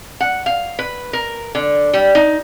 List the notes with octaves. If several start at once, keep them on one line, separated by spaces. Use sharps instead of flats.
F#5
F5
B4
A#4
D3
G3
D#4